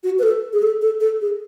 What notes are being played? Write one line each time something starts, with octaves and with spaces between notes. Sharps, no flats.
F#4
B4
A4
G#4
A4
A4
A4
G#4